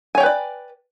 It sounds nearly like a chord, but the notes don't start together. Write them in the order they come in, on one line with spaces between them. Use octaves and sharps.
G#5 C#5 G5 B4 D5